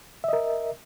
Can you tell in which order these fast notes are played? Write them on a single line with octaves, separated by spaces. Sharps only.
E5 D#5 A#4